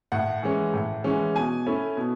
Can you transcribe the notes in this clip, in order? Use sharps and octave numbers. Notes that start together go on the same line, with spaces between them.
A2 F#5
E3 G#3 C#4
A2
E3 G#3 C#4
B2 G#5
A3 C#4 E4
B2